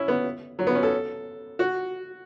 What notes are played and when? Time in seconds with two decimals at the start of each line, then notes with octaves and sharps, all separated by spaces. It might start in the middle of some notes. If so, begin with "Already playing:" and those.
Already playing: C#4 E4
0.08 B3
0.59 F#3
0.67 B3
0.75 C#4
0.83 A4
1.59 F#4